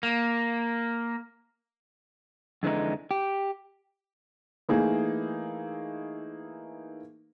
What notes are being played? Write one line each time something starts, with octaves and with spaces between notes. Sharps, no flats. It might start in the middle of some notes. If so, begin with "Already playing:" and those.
A#3
F2 D3 E3 G#3 D#4
G4
E3 A3 A#3 D#4 E4 G#4